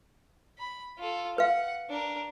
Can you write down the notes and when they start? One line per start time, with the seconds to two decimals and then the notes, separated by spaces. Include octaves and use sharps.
0.59 B5
0.98 F4 A4
1.38 B4 F5 F#5
1.89 D4 A#4